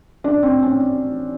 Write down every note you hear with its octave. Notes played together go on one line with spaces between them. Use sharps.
D4
C4
C#4